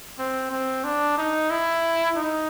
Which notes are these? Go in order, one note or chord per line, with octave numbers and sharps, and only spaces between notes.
C4
C4
D4
D#4
E4
D#4